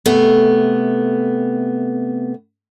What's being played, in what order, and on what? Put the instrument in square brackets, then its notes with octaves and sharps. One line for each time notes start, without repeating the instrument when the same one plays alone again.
[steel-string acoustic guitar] C3 A3 B3